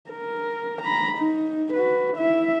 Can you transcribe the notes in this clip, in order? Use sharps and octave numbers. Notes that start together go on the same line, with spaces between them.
A#4
A#5 B5
D#4
F#4 B4
E4 E5